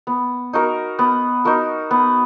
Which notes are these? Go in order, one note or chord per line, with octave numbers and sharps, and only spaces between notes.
B3
D#4 F#4 A#4
B3
D#4 F#4 A#4
B3